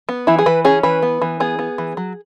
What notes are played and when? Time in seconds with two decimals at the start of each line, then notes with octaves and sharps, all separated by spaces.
0.09 B3
0.27 E3 E4
0.39 G#4
0.46 E3 B4
0.65 C#4 G#4
0.83 E3 B4
1.02 B3
1.22 E3
1.40 B3 G#4
1.59 B3
1.78 E3
1.97 F#3